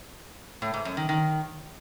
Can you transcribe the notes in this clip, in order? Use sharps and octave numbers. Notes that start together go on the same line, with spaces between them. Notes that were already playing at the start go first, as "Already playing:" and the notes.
A2
G#2
F#2
D#3
D#3